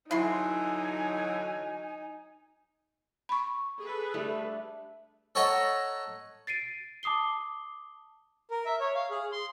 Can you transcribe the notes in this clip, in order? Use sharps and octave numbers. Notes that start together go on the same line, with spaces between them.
D3 E3 F#3 D#4 E4 G#5 C6
B5 C#6
G#4 A4 B4
G3 A3 D4
A4 C#5 D#5 F#5 A5 A#5
A6 C7 D7 D#7
A5 D6 D#6 C7 G7
A#4
E5
C#5
F5
G#4
C6